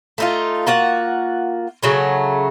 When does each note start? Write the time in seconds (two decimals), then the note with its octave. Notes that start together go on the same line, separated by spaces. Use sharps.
0.18 A3 D#4 F4
0.67 A#3 F4 F#4 F#5
1.83 C#3 F#3 A3